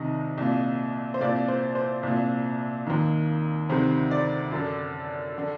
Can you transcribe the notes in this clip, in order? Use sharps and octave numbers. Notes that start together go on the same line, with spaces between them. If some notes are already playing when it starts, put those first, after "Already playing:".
Already playing: C2 C3 D#3 D#5
C2 A#2
C5
C2 A#2 D5
C5
C5
C2 A#2
D#2 D#3
D2 C3 D#3 C5
D5
F#2 D3
D3